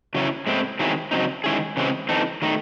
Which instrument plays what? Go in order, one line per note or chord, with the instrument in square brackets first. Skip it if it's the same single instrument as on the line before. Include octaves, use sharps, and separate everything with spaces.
[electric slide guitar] C#3 F#3 C#4 E4
A2 G#3 C4 E4
D#3 F#3 C4 E4 G#4
C#3 F#3 C4 D#4
D#3 G#3 C#4 E4 G#4
C#3 E3 G#3 C4
E3 C4 D#4 A4
D#3 A3 D#4